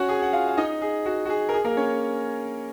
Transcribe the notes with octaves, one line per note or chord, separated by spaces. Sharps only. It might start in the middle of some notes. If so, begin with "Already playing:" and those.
Already playing: C#4 F#4 C#5 F#5
G#4 G#5
F#5
F4 F5
F5
D#4 D#5
G#4
F#4
F#4
G#4
A#4
G#4
A#3 A#4
C#4 C#5